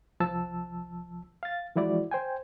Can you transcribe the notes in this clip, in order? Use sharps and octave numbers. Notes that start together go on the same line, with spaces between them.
C2 F3 A5 E6
F5 A6
E3 F3 G#3 E4 F#4 D5
C5 G5 G#5